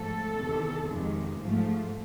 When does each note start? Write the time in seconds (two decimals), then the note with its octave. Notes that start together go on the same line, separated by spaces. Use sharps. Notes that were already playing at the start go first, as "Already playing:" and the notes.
Already playing: G#2 F3 A3 A4
0.37 E2 C3 D#3
0.88 F2 C3 D#3 G#3
1.39 G#2 F3 A3